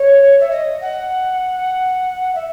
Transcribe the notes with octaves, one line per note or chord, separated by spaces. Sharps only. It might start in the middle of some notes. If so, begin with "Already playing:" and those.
Already playing: C#5
E5
D#5
F#5
E5